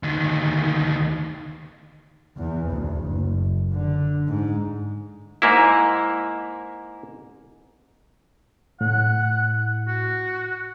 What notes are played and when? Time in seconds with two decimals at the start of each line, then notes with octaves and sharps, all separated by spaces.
0.03 D2 D#3
2.37 E2
2.70 D2
3.06 F#1
3.72 D3
4.27 G#2
5.42 G#2 A#3 E4
8.81 A2 F#5
9.87 F#4